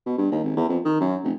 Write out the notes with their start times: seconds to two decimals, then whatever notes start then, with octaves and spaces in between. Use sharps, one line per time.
0.06 B2
0.18 G2
0.32 D#2
0.43 G#1
0.57 E2
0.69 F2
0.85 D#3
1.00 F#2
1.24 F1